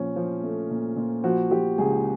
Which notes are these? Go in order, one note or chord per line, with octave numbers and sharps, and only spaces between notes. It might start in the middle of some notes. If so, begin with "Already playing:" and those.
Already playing: A#2 F3 C#4
F3
A3
A#2
A#2
F3 F#4
F3 G4
C#2 G#4